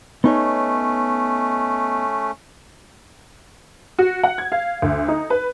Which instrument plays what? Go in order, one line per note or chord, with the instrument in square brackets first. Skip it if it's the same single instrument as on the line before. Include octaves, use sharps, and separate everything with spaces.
[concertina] A3 C#4 [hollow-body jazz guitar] B3 D#4 C#5
[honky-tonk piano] F#4
F#5
G#6
F5
D2
D#4
B4